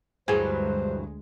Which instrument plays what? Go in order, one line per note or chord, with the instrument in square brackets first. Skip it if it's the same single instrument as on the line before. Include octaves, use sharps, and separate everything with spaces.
[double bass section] D2 G#3 [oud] G2 E3 F#3 [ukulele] G#4 [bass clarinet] C5